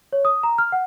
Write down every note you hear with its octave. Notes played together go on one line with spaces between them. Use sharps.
C#5
D#6
A#5
F6
F#5